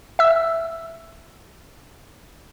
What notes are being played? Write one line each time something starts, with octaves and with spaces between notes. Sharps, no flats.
E5 E6